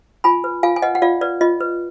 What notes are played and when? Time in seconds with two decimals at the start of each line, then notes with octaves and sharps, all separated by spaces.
0.24 F4 G#5 B5
0.44 B4
0.63 F4 F5 G#5
0.76 G#5
0.82 B4 D#5 F#5
0.95 F#5
1.02 F4 D5 F5
1.21 B4 D5
1.41 F4 D#5
1.60 B4